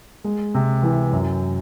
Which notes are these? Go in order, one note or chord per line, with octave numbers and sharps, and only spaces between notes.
G#3
C3
E3
F#2